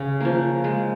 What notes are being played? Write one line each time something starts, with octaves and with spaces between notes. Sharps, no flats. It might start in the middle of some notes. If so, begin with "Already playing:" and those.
Already playing: C#3
F3 A#3
G#3